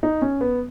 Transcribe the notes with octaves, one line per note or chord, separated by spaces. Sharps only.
D#4
C#4
B3